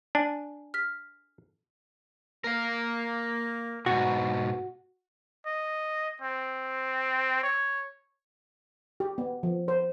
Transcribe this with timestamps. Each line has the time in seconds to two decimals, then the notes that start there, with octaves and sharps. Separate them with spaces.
0.15 D4 G#5
0.74 F6 B6
2.44 A#3 A#4 F5
3.86 G#2 B2 F#4
5.46 D#5
6.22 C4
7.43 C#5
9.00 G4
9.18 B3
9.43 F3
9.68 C5